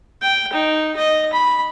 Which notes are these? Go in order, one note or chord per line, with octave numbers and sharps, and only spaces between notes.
G5
D#4
D#5
B5